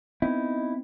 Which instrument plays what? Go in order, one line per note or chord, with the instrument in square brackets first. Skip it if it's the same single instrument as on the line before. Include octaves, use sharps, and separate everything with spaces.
[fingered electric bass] B3 C4 [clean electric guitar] D#4 E4